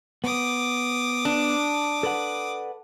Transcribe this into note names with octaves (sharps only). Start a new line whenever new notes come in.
B3 D6 D#6
D4
A4 B4 F#5